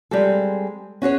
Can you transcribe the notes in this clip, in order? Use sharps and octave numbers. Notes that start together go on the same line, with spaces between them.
G3 G#3 C4 G4 A4
C#4 F#4 G#4 C#5